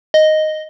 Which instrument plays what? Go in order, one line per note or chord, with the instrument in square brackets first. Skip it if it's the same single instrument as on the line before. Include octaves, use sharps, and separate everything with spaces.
[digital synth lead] D#5